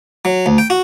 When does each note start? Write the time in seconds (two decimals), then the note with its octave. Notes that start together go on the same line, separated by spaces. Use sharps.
0.25 F#3
0.46 D2
0.58 G5
0.70 F#4